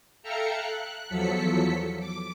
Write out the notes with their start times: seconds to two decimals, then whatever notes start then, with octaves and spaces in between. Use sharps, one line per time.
0.23 A4 E5 F5 G5 A#5 C#7
0.55 F#6
1.08 E2 F3 F#3 A4 B6 C#7
1.99 D6